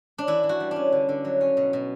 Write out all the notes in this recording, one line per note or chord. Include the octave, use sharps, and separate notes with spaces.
D4
E3 E4
E3
F#4
G3
D4
C#4
D3
D3
F#3
C#4
B2
B2